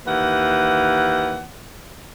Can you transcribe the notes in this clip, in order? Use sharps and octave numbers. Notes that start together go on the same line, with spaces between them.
D#2 E3 F#5